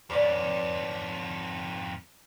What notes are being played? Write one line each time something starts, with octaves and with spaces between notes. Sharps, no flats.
F2 G#2 B4 C#5 D5